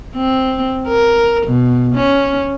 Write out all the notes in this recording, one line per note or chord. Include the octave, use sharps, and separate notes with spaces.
C4
A#4
B2
C#4